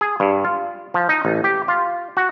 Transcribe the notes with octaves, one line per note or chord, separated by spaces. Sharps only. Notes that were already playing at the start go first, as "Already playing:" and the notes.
G#4
G2
F4
F3
D#4
A1
G4
F4
F#4